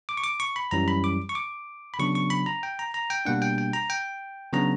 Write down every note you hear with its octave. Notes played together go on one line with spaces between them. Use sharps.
D6
C#6
D6
C#6
B5
F#2 E3 G3 C#4 A#5
B5
D6
C#6
D6
B5
C#3 F#3 B3 D4 C#6
C#6
B5
A#5
G5
A#5
A#5
G5
B2 G3 A#3 D4 F#5
G5
G5
A#5
G5
C#3 F#3 B3 D4 A#5